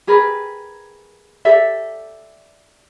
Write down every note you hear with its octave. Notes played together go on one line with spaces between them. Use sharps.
G4 G#4 A#4 B4
G4 A4 D5 E5